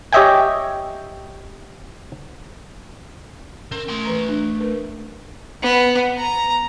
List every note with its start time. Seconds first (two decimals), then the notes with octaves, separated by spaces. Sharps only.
0.13 G4 C#5 D#5 E5 G5 G#5
3.72 C4 C#4 A#4
3.89 A3 C6
4.05 E3 B4 A#5
4.29 D4
4.60 A#4 B4
5.62 B3
6.18 A#5